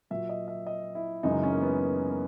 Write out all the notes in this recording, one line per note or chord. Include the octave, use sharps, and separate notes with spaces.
A#2 F#3 E5
D#5
E5
D#5
E4
F#2 C#3 E3 G#3 D#4
C#4
A#3
B3
B3
B3